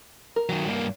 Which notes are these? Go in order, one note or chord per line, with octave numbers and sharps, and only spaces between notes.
A#4
D#3 F#3
G2 A#3